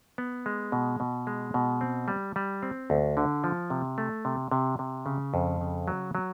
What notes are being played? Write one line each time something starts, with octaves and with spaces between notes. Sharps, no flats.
B3
G#3
B2
B2
G#3
B2
C4
G3
G3
C4
D2
D3
F3
C3
A3
C3
C3
C3
C#3
F2
C#3
F#3
F#3